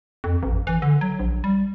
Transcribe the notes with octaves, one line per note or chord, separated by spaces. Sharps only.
F2
A1
E3
D3
F#3
A#1
G3